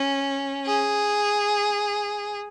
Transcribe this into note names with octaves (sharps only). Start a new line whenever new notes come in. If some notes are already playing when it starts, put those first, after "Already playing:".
Already playing: C#4
G#4